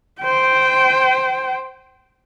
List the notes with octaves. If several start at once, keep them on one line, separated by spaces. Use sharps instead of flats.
C5 G5